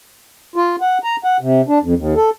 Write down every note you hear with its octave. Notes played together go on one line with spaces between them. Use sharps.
F4
F#5
A#5
F#5
C3
D4
F2
D#2
A4